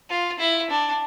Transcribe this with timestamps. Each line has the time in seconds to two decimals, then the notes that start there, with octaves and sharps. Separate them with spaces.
0.10 F4
0.39 E4
0.70 D4